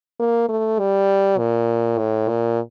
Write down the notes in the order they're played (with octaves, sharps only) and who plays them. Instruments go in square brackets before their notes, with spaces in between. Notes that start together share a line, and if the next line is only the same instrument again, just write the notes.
[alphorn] A#3
A3
G3
A#2
A2
A#2